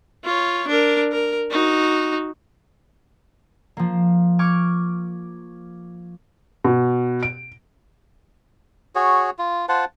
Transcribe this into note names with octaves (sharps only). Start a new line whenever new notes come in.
F4 C#5
D4 A#4
A#4
D#4 F#4
F3 A#3
C#6 D6 F6 G#6
B2
D7
F#4 G#4 C#5
F4
F4 C5 F#5 A5